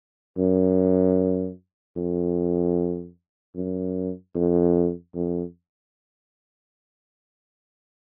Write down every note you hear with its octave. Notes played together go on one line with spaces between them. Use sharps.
F#2
F2
F#2
F2
F2